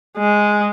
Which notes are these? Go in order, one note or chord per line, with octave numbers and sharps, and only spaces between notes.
G#3